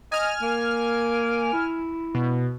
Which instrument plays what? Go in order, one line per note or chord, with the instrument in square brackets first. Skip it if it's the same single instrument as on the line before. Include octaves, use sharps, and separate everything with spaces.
[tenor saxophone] D#5 [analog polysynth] G#5 F6
[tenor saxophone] A#3
E4
[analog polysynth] B2